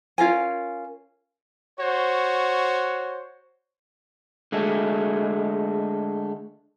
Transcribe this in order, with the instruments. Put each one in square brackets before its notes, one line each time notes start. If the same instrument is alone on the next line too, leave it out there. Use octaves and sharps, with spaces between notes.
[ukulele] C#4 F4 A#4 G#5
[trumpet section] F#4 C5 C#5
[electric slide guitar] D3 G#3 A3